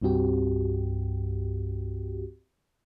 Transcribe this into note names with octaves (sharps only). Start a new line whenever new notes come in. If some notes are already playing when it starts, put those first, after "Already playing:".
C2 G2 C4 F#4 G4